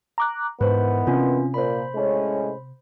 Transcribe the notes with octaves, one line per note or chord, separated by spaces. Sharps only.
A#5 D6 F#6
G#2 D#3 E3 B3 B4 C5
C3 C4 C#4 F4
A#2 C5 B5
A2 G#3 C#4